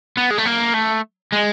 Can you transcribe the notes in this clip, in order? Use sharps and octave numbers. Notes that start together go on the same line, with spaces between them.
B3
G#3
A3
A#3
A3
G#3